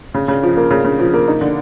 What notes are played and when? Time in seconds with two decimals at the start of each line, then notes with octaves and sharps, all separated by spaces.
0.14 C#3
0.28 C#3
0.43 F3
0.57 A#3
0.70 C#3
0.84 C#3
0.99 F3
1.13 A#3
1.28 D#4
1.41 D3